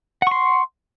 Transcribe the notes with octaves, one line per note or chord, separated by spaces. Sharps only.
F#5 C6 C#6